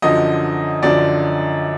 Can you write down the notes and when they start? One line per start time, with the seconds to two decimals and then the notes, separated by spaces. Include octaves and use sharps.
0.02 F#2 D3 F3 D#5
0.83 F#2 D3 F3 D5